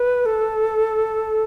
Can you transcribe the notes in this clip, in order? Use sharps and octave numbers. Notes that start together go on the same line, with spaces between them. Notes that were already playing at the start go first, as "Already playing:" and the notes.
Already playing: B4
A4